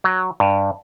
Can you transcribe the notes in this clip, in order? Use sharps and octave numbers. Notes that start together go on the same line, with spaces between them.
F#3
G2